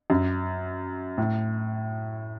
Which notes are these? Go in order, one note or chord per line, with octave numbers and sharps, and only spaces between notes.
F#2
A2